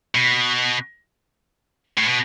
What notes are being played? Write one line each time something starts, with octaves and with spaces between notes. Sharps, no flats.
B2
A2
B2